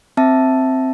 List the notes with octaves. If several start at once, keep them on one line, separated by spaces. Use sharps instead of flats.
C4 E5 A5